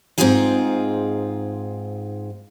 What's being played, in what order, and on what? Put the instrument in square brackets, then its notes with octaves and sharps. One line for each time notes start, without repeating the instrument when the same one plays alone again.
[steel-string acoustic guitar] G#2 C4 D#4 F4 G#4 F5